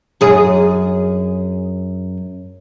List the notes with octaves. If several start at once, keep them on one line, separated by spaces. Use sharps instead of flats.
F#2 G#4